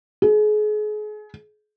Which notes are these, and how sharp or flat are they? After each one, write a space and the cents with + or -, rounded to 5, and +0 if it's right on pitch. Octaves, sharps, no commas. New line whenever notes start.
G#4 +35